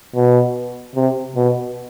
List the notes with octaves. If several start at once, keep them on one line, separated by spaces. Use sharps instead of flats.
B2
C3
B2